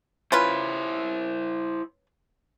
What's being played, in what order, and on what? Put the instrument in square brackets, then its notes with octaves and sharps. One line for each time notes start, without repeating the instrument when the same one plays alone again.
[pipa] C#4 F4 B4 [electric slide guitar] E4 C5